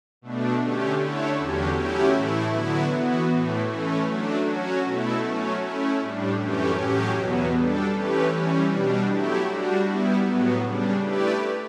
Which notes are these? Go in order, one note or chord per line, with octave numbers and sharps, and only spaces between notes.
B2 A3 D4
D3 A3 C#4 G4
D3 A3 E4 A4 C#5
E2 D3 F#3 C#4 G4
F#3 A3 C#4 E4 G4
A2 E3 A3 E4
D3 F#3 B3 E4
E3 B3 F#4
A2 E3 A3
E3 A3 C#4
F#3 A3 D4
F#3 C#4 F#4
B2 A3 E4 A4
F#3 A3 C#4
A3 C#4 E4
A2 G3 D4
F#2 E3 A3 C#4 G4
A2 F#3 C#4 G4
E2 B2 F#3 B3
G3 D4 A4
E3 A3 C#4 G4 B4
E3 G3 C#4
B2 G3 D4
F#3 A3 E4 G4
G3 D4 F#4
G3 B3 E4
A2 F#3 B3
C#3 G3 D4
A3 E4 G4 B4 D5